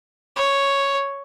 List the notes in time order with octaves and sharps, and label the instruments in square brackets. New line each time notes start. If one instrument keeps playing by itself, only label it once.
[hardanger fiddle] C#5